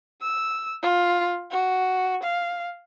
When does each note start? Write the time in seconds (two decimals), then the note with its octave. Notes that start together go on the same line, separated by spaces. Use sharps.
0.22 E6
0.83 F4
1.51 F#4
2.23 F5